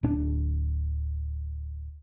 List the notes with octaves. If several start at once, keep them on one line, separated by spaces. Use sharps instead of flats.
D1 D4